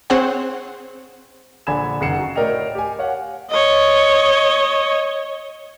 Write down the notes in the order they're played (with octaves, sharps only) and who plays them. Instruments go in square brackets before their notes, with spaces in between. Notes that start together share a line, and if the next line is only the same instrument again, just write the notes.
[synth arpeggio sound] C4 G#4 C5 C#5 F#5
[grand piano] A#1 D3 G#5 B5 G#6 E7
F#1 D#3 F#5 C7 C#7 E7
F#4
A2 A#4 D5 D#5 G5 F7
G4 G#5
C#5 F5 F#5
[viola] C#5 D#5